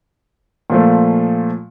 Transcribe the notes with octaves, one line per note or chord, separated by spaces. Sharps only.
A#2 F3 A3